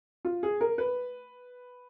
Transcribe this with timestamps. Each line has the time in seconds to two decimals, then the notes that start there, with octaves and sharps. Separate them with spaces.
0.25 F4
0.43 G#4
0.61 A#4
0.78 B4